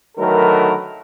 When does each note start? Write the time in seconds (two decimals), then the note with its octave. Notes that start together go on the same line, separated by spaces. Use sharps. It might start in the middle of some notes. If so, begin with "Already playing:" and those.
0.18 D3 D#3 F#3 A3 A#4 B4